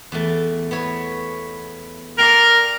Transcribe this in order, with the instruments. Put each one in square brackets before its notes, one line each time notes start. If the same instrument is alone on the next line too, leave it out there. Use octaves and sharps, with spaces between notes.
[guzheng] E2 A3
B3 E4 C#5
[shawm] A#4 [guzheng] D5 F5 G5